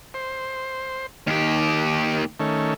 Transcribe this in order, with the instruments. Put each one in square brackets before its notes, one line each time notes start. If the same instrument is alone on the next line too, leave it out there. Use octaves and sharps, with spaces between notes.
[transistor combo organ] C5
[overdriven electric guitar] D#2 G4 [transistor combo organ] D#3
[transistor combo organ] D#3 A3 C#4